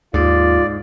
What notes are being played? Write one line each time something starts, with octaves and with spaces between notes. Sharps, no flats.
D#2 G#2 F4 D5